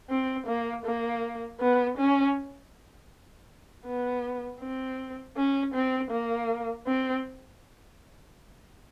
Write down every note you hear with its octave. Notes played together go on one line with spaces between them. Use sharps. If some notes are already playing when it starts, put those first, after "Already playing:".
C4
A#3
A#3
B3
C#4
B3
C4
C#4
C4
A#3
C4